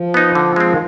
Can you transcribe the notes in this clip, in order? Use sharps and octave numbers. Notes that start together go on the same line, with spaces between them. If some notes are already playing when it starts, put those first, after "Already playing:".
Already playing: F3
B3 D#4
D3
G#3 C4
D#3